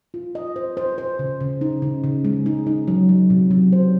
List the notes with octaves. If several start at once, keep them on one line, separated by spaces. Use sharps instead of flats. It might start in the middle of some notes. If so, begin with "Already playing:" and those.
F4
D#5
C5
C5
C5
C#3
C#3
D#4
C#3
C#3
G#3
D#4
D#4
F#3
F#3
C3
F#3
C5